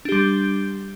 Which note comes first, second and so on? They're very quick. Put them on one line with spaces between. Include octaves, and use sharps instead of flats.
D4 G4 G3